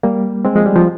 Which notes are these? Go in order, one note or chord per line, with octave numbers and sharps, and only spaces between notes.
G3 A#3
G#3 C4
F3 G#3
G3
F3